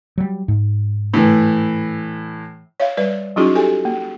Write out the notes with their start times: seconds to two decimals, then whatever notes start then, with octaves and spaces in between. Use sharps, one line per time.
0.18 F#3 G3
0.48 G#2
1.14 A2 E3
2.80 C#5 E5 F5
2.97 G3 B4 D5
3.36 F#3 C#4 D#4 E4 F#4 G#4
3.55 G4 A4 G#5
3.85 A#3